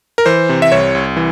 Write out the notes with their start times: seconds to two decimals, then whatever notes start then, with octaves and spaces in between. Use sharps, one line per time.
0.18 A#4
0.26 E3 C5
0.49 C3
0.62 E5
0.72 C2 C#5
0.95 C2
1.17 E3